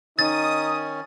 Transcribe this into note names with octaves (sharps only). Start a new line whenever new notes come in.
D#3 C#4 D#4 D#6 A6